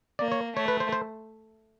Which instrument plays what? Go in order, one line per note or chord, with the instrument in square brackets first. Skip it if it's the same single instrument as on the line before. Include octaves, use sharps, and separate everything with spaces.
[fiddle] A#3 [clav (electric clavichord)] D5
[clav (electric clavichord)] C#5
[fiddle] A3 [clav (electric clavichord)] C#5
[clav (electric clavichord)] B4
C5
C5